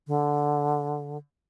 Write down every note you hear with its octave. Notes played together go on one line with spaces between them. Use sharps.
D3